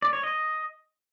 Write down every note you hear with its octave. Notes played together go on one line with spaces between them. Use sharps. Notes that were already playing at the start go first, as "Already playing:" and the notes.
D5
C#5
D#5